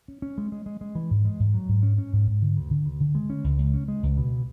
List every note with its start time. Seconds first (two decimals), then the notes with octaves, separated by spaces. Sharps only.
0.08 C#4
0.22 C#4
0.38 G#3
0.52 G#3
0.66 G#3
0.81 G#3
0.95 E3
1.11 G#2
1.25 G#3
1.40 G#2
1.54 F#3
1.69 G#2
1.83 C#4
1.98 C#4
2.13 G#2
2.27 G#2
2.42 D3
2.57 D2
2.71 D3
2.85 D2
3.00 D3
3.15 G#3
3.30 C#4
3.44 C#2
3.59 C#2
3.74 C#4
3.88 G#3
4.03 C#2
4.17 B2